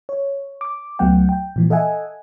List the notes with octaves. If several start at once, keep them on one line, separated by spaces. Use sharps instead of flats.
C#5
D6
C#2 F#3 A3 B3 F#5 G5
G5
A#2 E3 F3
A4 D#5 E5 F#5 G#5